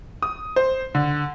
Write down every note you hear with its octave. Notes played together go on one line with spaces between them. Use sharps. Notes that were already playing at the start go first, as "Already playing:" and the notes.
D#6
C5
D3